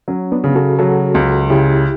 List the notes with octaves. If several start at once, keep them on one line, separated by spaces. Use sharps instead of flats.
F#3 C#4
B3 D4
C#3
F#4 A4
F#3 F#4 A4
C#2
C#3 E4 G4